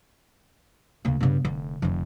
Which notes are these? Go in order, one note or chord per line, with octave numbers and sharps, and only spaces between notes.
D2 C#3 A#3
G2 C#3 B3
F1 D3
F1 F2 D3